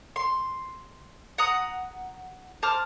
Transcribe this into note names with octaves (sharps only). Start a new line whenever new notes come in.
C6
F#5 A#5 D#6
C5 A5 D6 F6